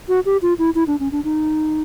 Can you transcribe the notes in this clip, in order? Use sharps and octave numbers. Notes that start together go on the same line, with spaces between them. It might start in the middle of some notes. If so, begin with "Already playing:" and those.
F#4
G4
F4
E4
E4
D4
C#4
D4
D#4